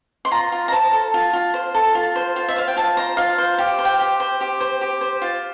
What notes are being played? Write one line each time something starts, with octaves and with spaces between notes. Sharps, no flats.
C6
F4 A#5
F4
A#5
C5 A5
A4
F4
F4
C5
A4
F4
C5
F4
E5
C5 F5
G5
F4 A5
C5 A#5
F4 F5
C5
G4 F5
C5
G5
G4
C5
G4
C5
G4
C5
F4